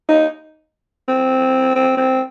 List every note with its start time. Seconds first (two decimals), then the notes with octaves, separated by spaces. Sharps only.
0.09 D#4
1.08 C4
1.76 C4
1.97 C4